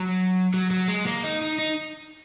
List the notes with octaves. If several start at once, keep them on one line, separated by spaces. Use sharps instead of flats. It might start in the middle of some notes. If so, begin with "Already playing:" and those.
Already playing: F#3
F#3
F#3
G#3
A#3
D#4
D#4
D#4